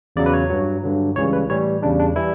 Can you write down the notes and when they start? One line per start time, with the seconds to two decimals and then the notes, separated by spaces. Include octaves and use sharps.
0.16 E2 C#3 F#3 D5
0.26 B4
0.33 C#5
0.50 G2 F#3
0.83 G2 D3 F#3
1.16 C#2 C#3 E3 G3 C#5
1.33 B4
1.50 A2 E3 G3 C#5
1.82 E2 C#3 G3 D4
1.99 D4
2.16 E3 G3 E4